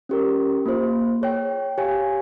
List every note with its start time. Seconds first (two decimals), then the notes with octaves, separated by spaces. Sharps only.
0.09 C#4 G4 A#4
0.66 A#3 F4 C5
1.21 G#4 C#5 G5
1.78 G4 C#5 F5 G#5